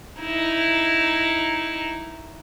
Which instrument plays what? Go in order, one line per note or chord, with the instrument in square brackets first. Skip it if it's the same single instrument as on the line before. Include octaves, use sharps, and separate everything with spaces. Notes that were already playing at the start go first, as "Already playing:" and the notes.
[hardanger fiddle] D#4 E4